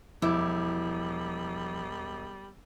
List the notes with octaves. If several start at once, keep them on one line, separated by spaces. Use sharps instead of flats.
E1 F3 G3 E4 D6 E6